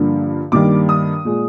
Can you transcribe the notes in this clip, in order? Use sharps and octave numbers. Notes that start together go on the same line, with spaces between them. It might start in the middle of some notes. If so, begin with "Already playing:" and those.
Already playing: G2 D3 F3 A#3
G2 D#3 G3 A#3 D6
D#6
A#2 G#3